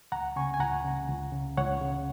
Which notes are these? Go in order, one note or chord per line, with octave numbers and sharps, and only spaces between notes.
C#2 F#5 A#5
C#3 G#5 C#6
G#5
C#2 F#5 A#5
C#3
C#2
C#3
C#2 C#5 F#5
C#3